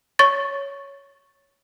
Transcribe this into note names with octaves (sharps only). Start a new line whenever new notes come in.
C#5 C#6 A6